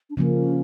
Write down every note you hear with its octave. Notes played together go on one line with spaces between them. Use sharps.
D4
C#3 F3 A#3 C#4